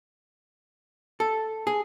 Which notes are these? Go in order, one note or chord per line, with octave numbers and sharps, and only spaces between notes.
A4
G#4